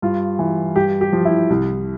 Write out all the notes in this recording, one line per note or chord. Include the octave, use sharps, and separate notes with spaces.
G2 F4
E3
G2 G4
G4
F3
E4
C2